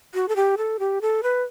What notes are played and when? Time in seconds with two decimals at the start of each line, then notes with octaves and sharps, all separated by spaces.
0.15 F#4
0.28 A4
0.36 G4
0.57 A4
0.79 G4
1.02 A4
1.23 B4